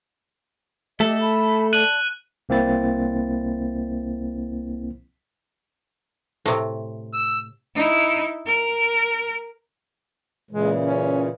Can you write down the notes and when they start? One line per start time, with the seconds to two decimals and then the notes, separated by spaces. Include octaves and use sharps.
1.00 A3 G4 A4 D#5
1.20 A5 B5
1.73 D5 A5 F#6 D#7 F#7
2.49 C2 A#3 C4 E4 A6
6.46 A2 C3
7.13 E6
7.75 D#4 E4
8.46 A#4
10.51 A#2 C#3 E3 G#3
10.82 C#4